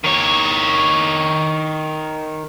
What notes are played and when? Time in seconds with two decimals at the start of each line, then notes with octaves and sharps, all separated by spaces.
0.04 D#3 C#5